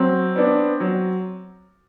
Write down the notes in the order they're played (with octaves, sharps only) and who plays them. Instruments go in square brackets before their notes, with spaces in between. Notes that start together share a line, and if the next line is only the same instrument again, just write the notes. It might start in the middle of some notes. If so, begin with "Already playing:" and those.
Already playing: [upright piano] F#3 [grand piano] C4
[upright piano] B3 D4
F#3